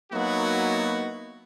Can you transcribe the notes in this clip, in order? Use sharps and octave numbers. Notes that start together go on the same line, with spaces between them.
F#3 A#3 B3 D#4 E4 F#4